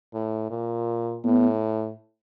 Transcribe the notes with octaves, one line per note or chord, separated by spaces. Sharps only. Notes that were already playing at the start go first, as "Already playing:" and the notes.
A2
A#2
A2 B3